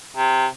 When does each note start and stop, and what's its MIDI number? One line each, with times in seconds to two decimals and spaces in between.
0.17 0.47 48